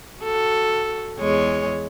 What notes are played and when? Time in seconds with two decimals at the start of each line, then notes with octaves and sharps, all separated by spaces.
0.20 F#4 A4
1.19 E2 G#3 C#5